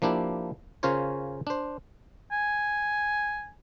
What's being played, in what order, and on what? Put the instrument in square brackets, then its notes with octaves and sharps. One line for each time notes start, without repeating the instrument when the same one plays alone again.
[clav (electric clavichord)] F3 A#3 D4 E4 G4
C#3 C#4 F4 A#4 C5 C#5
D4 C5
[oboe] G#5